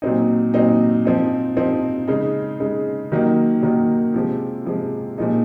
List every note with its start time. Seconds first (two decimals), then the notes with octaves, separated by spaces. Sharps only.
0.02 A#2 F#3 C4 D#4
0.54 A#2 F#3 C4 D#4
1.05 F3 C4 D#4
1.57 F3 C4 D#4
2.08 C#3 G#3 D#4
2.60 C#3 G#3 D#4
3.12 D#3 F#3 A#3 D#4
3.63 D#3 F#3 A#3 D#4
4.14 C3 F3 G#3
4.65 C3 F3 G#3
5.18 A#2 F3 G#3 D#4